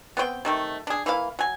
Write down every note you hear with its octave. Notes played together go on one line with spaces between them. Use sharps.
B3 C4 C5 G5
C3 D#3 A3
D4 G#4
E3 A#3 E4 F5
F#3 G#5